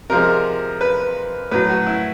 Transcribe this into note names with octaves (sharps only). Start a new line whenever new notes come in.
C3 F3 G#3 A#4
B4
A2 F#3 B4
F#4
E4